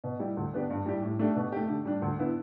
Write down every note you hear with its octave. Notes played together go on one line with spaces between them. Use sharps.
B2
G3 E4 G4
D2
D3 B3 D4 G4
G2
G3 E4 G4
A2
A3 D4 G4
B2
A3 G4
D3
G3 D4
D2
D3 B3 E4